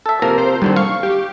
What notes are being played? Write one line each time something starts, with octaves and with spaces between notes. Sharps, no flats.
A4 E5
C3 F3 A#3 A#4
C5
D#2 D3 G3 C4
F5 C#6
G4